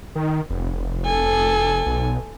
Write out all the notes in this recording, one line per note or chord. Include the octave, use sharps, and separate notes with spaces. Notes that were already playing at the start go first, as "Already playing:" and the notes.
D#3
F1
A4 G#5
B1